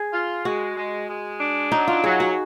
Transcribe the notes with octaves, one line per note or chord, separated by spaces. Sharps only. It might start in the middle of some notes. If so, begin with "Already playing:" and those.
Already playing: G#4
F4
G#3 F#4
G#3
G#3
D4
F#3 D#4
F4
F#3 G#4
F#4